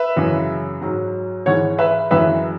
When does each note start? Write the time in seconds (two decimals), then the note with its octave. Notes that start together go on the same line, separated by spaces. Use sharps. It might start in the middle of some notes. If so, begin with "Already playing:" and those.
Already playing: B4 E5
0.16 F#2 C#3 E3 G#3
0.81 G#2 F#3
1.46 G#2 E3 G#3 C#5 F#5
1.79 B4 E5
2.11 F#2 E3 G#3 B4 E5